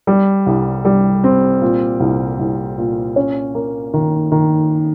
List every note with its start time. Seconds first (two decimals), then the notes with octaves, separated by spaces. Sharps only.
0.07 G3
0.46 C2
0.85 G3
1.24 C4
1.61 A#2
2.00 C2
2.39 C2
2.78 A#2
3.16 C#4
3.55 A#3
3.94 D#3
4.32 D#3